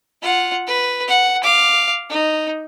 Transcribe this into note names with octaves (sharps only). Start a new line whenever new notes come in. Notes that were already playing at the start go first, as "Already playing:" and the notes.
F4 F#5
B4
F#5
F5 D6
D#4